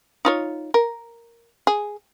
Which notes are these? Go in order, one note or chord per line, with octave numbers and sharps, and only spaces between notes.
D#4 F4 C#5
A#4
G#4